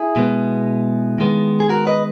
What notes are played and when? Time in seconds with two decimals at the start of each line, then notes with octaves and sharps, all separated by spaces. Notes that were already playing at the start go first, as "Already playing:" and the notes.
Already playing: E4 G#4
0.16 B2 G#3 B3
1.18 D#3 G#3 B3
1.60 G#4
1.69 F#4 A#4
1.87 B4 D#5